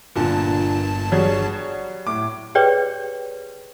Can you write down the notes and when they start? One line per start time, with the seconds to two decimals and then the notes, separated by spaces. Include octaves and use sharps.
0.16 G1 G2 A#2 D3 A5
1.12 F#3 G3 G#4 C#5
2.07 A2 D6
2.55 G4 G#4 B4 C#5 D5 G5